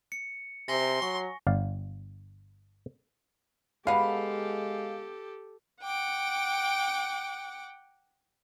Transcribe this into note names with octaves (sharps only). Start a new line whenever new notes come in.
C#7
C3 G#5 C6 A#6
F#3 C#6
G1 D5 F5
D3 G#3 B3 G4 A4 F5
F#5 G5 D6